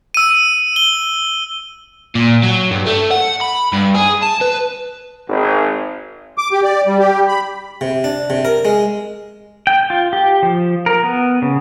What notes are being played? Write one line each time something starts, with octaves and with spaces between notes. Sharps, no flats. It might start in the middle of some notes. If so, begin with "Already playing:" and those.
E6 D#7
G7
A#2
F#3
G2
A3
F#5
B5
G2
G#4
A5
B4
G#1
D6
G4
D5
G3
G4
B5
C3
D4
C3
A#4
G#3
G5
F4
G4
F3
A#4
B3
C#3